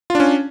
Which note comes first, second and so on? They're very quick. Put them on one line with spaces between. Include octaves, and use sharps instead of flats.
F4 D4 C#4